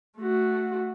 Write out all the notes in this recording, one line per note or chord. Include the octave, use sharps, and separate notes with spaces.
A3 F#4